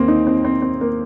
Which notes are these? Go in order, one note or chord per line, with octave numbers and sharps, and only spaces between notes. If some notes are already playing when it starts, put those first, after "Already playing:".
Already playing: D#2 D#3 A#3 C4
D#4
C4
C4
C4
A#3